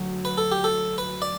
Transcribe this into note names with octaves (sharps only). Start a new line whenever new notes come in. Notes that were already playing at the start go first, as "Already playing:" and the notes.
Already playing: D2 F#3
B4
A4
G4
A4
B4
D5